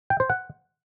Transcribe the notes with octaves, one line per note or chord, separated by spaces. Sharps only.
G5
C5
F#5